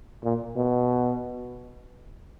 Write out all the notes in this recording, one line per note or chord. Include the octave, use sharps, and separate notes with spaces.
A#2
B2